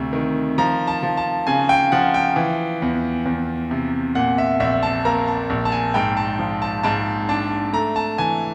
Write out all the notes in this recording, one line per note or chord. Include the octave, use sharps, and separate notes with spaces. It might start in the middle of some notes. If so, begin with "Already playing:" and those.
Already playing: D2 C3
D#3
F3 A#5
A5
F3
A5
C#3 G#5
G5
F3 F#5
G5
E3
E2
E2
C3
A#2 F#5
E5
A#1 E5
A5
A#3 A#5
A5
A#1
A5
G#5
G#2 G5
A5
F3
A5
G#2 A5
D4 A5
A3 A#5
A5
E3 G#5